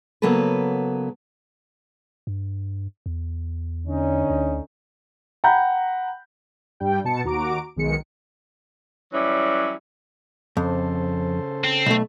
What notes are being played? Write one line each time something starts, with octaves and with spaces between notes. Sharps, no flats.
C#3 F#3 A#3 B3 A4 B4
G2
E2
D3 C#4 D#4
D2
F#5 G5 A#5 B5 G6
G2 G3 G5
B2 B3 A5 C#7
D#2 F#4 A#5 D6 D7
B1 D#3 G#3 C#7
E3 F#3 G3 C#4 E4
F2 C#3 A4 C5
C4
B1 A3